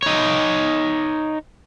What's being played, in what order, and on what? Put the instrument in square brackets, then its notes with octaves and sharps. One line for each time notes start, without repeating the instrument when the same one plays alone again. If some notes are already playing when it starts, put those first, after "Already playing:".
[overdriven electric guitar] D#4 C#5